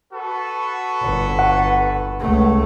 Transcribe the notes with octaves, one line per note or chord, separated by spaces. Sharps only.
F#4 A4 B4
G1
F#5
C#2 A3